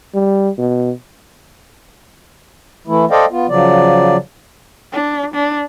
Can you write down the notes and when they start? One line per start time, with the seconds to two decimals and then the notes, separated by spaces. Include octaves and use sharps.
0.14 G3
0.58 B2
2.87 E3 A3 E4
3.11 A4 C5 D5 D#5 F5 G5
3.31 B3 F4
3.49 C#3 F3 F#3 D5
4.92 D4
5.34 D4